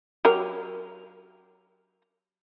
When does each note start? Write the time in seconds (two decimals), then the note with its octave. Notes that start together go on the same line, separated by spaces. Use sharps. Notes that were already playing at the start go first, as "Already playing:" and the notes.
0.25 F#3 G4 A#4